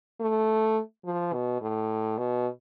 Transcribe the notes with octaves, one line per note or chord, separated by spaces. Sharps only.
A3
F3
B2
A2
B2